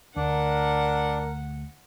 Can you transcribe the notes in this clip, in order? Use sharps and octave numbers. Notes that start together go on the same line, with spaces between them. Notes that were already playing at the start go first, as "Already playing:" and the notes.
D2 D4 A#4 F#5